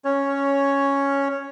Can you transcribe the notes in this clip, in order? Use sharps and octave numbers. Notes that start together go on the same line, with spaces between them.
C#4 C#5